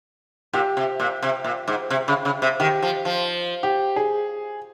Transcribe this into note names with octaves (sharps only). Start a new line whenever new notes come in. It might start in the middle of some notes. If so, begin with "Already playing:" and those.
A#2 G4
C3
A#2
C3
A#2
G#2
C3
C#3
C#3
C3
D#3 G4
F3
F3
G4
G#4